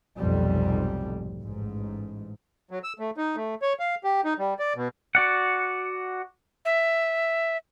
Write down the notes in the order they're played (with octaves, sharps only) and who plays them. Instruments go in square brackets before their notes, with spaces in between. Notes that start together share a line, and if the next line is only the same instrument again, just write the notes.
[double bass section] F1 B1 F2 G#2 G3
A1 G#2
[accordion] F#3
E6
A3
D#4
A3
C#5
F5
G4
D#4
G3
D5
B2
[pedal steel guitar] F#4 D5 F#5
[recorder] E5